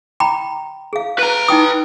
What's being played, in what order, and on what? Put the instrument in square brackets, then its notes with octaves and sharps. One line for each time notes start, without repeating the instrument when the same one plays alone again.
[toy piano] G5 A#5 B5
G#4 F5
[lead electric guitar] B4 A#5
[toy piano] D#4 G5 D#6